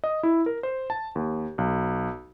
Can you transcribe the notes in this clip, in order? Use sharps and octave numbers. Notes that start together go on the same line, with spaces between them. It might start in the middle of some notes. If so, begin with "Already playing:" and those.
D#5
E4
A#4
C5
A5
D#2
B1